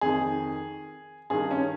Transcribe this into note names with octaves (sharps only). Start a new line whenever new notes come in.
F2 D#3 G#4
G2 D#3 G#4
C#4